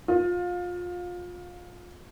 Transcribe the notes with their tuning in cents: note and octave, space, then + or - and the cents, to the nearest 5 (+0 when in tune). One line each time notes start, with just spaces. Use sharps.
F4 +25